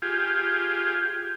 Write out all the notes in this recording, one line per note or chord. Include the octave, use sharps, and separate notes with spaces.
F4 G4 G#4